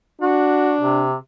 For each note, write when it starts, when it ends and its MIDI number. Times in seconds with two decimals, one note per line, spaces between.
0.21 1.06 62
0.21 0.74 66
0.80 1.15 48